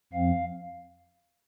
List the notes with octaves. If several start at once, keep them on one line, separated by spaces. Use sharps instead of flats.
F2 F3 C4 F5